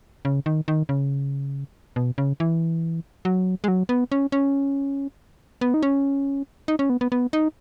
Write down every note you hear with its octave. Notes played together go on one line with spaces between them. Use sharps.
C#3
D#3
D#3
C#3
B2
C#3
E3
F#3
G#3
F#3
B3
C#4
C#4
B3
D#4
C#4
D#4
C#4
B3
B3
B3
D#4